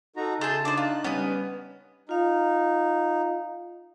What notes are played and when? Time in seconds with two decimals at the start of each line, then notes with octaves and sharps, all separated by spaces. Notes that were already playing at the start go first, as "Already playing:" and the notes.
0.16 D#4 F#4 A4 A#5
0.41 C#3 A3 G#4 A5 C6 G6
0.65 D4 D#4 C5 D5 F#6
0.77 F4
1.04 G3 B3 C#4 B4 D#6
2.09 D#4 F4 F5